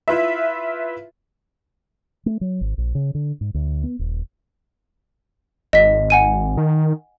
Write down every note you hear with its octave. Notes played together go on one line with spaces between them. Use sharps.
E4 F4 B4 E5
A3
F#3
G#1
A#1
C#3
D3
G#2
D2
B3
D#1
G#1 D#5 B6
F#5 G#5 D#7
D#3